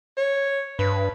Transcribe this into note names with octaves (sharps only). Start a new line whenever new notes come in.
C#5
G2 B4